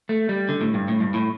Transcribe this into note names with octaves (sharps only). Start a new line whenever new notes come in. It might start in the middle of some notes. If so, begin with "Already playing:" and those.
A3
G3
D3
A2
G2
A2
G2
A2